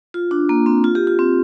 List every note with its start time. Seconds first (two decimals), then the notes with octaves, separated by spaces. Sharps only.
0.14 F4
0.31 D4
0.49 A#3
0.66 C4
0.84 F4
0.95 G4
1.07 F4
1.19 C4